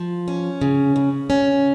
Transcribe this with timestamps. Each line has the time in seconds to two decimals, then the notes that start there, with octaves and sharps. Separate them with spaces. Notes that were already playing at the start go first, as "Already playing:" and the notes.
Already playing: F3
0.28 C#4
0.61 C#3
0.96 C#3
1.30 C#4